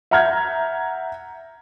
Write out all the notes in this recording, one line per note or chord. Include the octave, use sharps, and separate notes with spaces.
E5 F#5 A#5 F6 G6 G#6